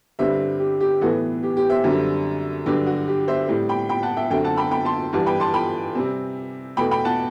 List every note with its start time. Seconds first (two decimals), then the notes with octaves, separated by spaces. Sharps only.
0.19 G2 D3 G3 C4 C5 E5
0.60 G4
0.80 G4
1.01 A2 E3 B3 F#4 A4
1.43 G4
1.57 G4
1.70 C5 E5
1.84 F#2 D3 G3 C4
2.66 G2 D3 F#3 G4
2.86 F#4
3.08 G4
3.28 C5 E5
3.49 A2 G3 C4
3.69 G5 B5
3.89 G5 B5
4.03 F#5 A5
4.17 E5 G5
4.30 F#2 D3 A3 C4 E5 G5
4.44 F#5 A5
4.57 G5 B5
4.71 G5 B5
4.85 A5 C6
5.13 G2 E3 G3 F#5 A5
5.26 G5 B5
5.40 A5 C6
5.54 G5 B5
5.95 C3 G3 C4
6.77 E2 B2 A3 G5 B5
6.91 G5 B5
7.05 F#5 A5